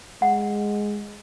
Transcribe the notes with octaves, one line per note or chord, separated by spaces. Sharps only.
G#3 F#5